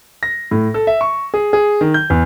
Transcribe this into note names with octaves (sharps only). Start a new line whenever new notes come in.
A#6
A2
A4
E5
C#6
G#4
G#4
D#3
G6
E2